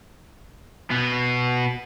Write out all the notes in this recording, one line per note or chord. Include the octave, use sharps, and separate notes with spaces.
B2 B3